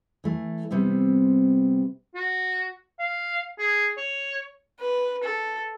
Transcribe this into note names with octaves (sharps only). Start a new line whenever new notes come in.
E3 A3
C3 G3 B3 C4
F#4
F5
G#4
C#5
B4
A4